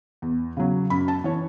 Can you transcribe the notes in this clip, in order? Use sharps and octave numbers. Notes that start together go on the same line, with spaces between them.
E2
C#3 F#3
F#2 B5
A5
E3 C#5